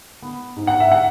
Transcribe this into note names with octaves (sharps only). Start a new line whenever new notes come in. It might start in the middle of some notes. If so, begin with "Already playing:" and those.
B3
G#2
F#5
E5
F#5